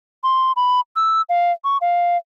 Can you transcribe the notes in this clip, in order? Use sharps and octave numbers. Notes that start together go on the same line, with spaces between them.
C6
B5
E6
F5
C#6
F5